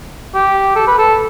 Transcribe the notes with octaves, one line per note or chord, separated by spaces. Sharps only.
G4
A4
B4
A4